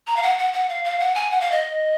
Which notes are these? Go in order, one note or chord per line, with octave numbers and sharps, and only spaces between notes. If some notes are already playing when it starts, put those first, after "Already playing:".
A#5
F5
F#5
F#5
F#5
F5
F5
F#5
G#5
F#5
F5
D#5